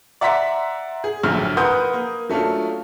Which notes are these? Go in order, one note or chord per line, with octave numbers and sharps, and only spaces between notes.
D5 E5 F#5 A#5 C6 B6
G#4
A#1 F#2 A2 D3 F6
A#4 B4 F#5 C6 D#6 G6
A#3
F#3 A3 C#4 D4 F4